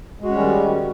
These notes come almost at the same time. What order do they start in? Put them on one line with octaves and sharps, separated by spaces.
G#3 F#4 C#4 G3 D#3